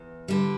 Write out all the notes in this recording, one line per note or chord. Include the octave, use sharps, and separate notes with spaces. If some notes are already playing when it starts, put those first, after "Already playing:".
Already playing: E2
D3 G3